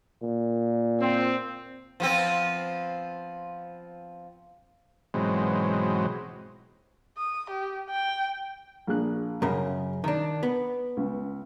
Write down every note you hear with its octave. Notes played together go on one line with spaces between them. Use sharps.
A#2
C4
F3 B3 C4
G#2 B2 E3 F#3 G#3 C4
D#6
G4
G5
A#1 G#4 F#6
F#2 C#3 A#4
D#3 D4 A#5
B3
C#2